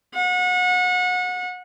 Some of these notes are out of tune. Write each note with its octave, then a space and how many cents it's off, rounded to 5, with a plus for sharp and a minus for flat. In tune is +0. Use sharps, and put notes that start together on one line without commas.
F#5 -30